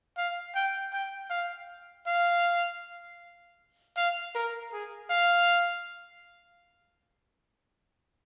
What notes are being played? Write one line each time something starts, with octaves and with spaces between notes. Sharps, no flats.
F5
G5
G5
F5
F5
F5
A#4
G#4
F5